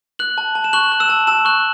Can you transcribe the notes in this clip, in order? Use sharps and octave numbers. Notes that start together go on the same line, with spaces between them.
F#6 F#7
A5
A5
E7
C#6 F#6 F#7
F#6
E6 E7
A5
A5 E6 E7
C#6 F#6 F#7